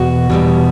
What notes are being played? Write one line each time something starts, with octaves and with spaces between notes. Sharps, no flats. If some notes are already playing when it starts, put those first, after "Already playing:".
Already playing: E2 B2 F#4
E2 B2 G3